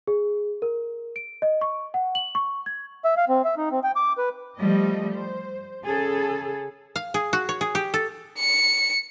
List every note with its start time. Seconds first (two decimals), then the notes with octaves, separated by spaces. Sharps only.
0.07 G#4
0.62 A#4
1.16 D7
1.42 D#5
1.61 C#6
1.94 F#5
2.15 F#7
2.35 C#6
2.66 G#6
3.05 E5
3.17 F5
3.29 C4
3.45 E5
3.57 D#4
3.72 C4
3.84 G5
3.96 D6
4.18 B4
4.59 F3 G3 A3 D#5
5.14 C5
5.82 C#3 G#4 A4
6.96 F5
7.14 G#4
7.33 F#4
7.49 C#5
7.61 G#4
7.75 G4
7.94 A4
8.39 C#7